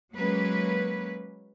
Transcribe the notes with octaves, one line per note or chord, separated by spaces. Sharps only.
F#3 G#3 A#3 C#4 B4